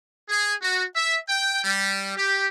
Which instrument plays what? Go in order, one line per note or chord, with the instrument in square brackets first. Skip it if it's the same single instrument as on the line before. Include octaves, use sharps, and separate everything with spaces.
[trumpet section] G#4
F#4
E5
G5
G3
G4